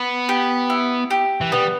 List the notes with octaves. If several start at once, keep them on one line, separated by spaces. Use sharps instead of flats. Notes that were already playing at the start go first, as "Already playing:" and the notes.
Already playing: B3
G4
E4
G4
E3
G3 B3